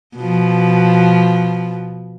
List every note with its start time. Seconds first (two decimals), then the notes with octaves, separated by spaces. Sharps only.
0.17 B2 F3